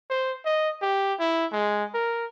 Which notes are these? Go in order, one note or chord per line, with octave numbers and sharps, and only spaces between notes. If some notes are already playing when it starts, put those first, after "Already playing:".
C5
D#5
G4
E4
G#3
A#4